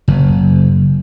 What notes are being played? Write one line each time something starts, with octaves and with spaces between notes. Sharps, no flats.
F#1